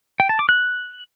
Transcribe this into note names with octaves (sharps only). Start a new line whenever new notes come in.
G5
A5
D6
F#6